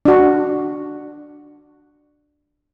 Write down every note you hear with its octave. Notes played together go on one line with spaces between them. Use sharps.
D4 F#4